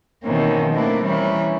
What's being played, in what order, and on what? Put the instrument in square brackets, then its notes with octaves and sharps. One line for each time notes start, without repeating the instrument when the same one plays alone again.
[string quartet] B2 D#3 E3 A#3 C4 C#4
A3 A#3 C4 D4 E4 B4
E3 G3 C#4 E4 A#4